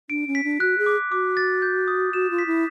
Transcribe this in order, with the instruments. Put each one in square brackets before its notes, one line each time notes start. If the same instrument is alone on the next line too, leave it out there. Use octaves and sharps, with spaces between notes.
[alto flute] D4 [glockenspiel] D7
[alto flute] C#4
[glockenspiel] B6
[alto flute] D4
[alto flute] F#4 [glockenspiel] F#6
[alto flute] G#4
[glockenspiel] D6
[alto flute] F#4 [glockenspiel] D6
[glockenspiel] A6
G6
D#6
[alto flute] F#4 [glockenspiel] E7
[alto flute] F4
[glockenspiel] B6
[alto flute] E4